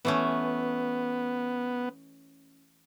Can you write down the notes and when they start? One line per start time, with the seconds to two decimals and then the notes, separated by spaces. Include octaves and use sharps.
0.05 E3 A3 B3 C#4